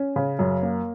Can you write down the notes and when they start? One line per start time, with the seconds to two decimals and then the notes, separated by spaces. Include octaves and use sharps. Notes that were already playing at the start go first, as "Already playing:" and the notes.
Already playing: C#4
0.16 C#3
0.39 F#2
0.62 A#3